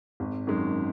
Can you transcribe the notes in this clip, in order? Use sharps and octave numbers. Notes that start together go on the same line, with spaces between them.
G#1
F#2 D#3 G#3